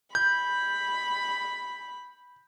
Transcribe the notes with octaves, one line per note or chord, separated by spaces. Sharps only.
B5 G6